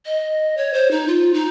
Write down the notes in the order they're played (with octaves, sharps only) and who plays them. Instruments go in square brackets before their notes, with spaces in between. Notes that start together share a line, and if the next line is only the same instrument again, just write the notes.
[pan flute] D#5
C#5
C5
D#4
F4
D#4